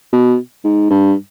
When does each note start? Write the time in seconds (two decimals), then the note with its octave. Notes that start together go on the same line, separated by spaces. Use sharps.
0.13 B2
0.64 G#2
0.90 G2